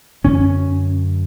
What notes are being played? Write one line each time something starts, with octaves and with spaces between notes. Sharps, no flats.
F#2 D3 C#4